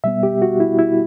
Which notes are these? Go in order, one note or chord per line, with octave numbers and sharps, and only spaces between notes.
B2 G3 B3 E5
G4
F#4
E4
E4